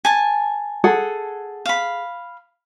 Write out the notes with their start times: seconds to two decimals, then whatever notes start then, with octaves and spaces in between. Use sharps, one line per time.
0.05 G#5 A5
0.84 G#4 A4 F#5
1.66 F5 B5